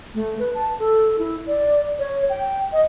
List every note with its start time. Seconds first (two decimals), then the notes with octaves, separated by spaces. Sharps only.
0.14 A3
0.39 B4
0.55 A5
0.79 A4
1.19 E4
1.47 D5
1.99 C#5
2.30 G5
2.73 D#5